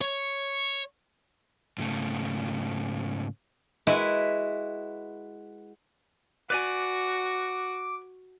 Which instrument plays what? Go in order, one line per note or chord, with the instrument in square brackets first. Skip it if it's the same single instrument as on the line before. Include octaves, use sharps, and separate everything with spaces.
[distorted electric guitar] C#5
[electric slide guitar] G#2 C#3 A3
[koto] G#3 E4 F#4 B4 E5
[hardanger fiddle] F#4 [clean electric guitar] B4 D5 G#5 [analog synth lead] D6